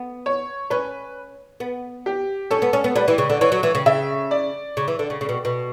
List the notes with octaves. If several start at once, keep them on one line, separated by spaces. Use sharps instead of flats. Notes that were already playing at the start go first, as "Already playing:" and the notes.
Already playing: B3
C#5
C#4 B4
B3
G4
C#4 A4
B3
C#4
B3
G3 B4
E3
C#3
D3
E3 C#5
F#3
E3
C#3
C#3 E5
D5
C#3
E3
D3
C#3
C#3
B2
B2